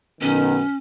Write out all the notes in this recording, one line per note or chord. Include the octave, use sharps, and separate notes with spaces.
B1 D#3 B3 C#4